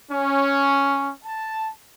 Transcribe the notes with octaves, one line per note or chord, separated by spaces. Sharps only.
C#4
A5